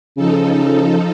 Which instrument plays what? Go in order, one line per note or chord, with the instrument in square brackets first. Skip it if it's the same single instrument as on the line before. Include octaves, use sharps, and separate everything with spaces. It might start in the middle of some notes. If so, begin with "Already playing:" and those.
[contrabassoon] C#3 [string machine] F3 D#4 A4